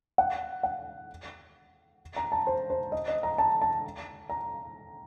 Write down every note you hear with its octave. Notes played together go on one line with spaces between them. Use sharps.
F#5
F#5
A#5
A5
C5
C5
D#5
D#5
A#5
A5
A5
A#5